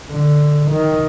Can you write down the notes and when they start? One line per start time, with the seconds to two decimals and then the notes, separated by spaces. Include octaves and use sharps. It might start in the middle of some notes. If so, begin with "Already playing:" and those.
0.10 D3
0.71 D#3